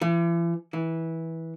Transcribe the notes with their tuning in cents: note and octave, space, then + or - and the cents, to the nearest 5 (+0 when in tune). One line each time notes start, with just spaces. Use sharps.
E3 +40
E3 -15